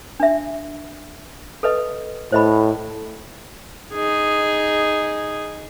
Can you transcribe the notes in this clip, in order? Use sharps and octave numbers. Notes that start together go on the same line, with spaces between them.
D4 E5
A4 B4 D#5
A2 C5 D#5 B5
D#4 G#4